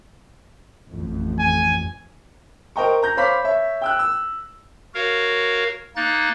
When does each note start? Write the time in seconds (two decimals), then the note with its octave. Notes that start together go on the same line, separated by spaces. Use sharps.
0.88 A1 F2
1.39 G#5
2.76 A#4 C5 D#5 G5 A#5 C#6
3.02 A#5 G6 A#6
3.17 C5 C#5 F5 B5 D6 B6
3.44 C#5 E5
3.82 G5 E6 F#6
3.99 E6
4.94 F#4 A#4 C#5 F5
5.96 A#3 D#4 F#6 A6